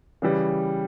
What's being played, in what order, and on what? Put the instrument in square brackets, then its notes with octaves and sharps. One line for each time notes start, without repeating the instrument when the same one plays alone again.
[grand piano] C#3 E3 G3